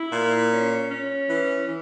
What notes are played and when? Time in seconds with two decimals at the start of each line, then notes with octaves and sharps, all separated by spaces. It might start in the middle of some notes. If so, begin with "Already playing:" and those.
Already playing: E4
0.13 A#2
0.51 C#4
0.89 C#4
1.28 E3
1.65 E3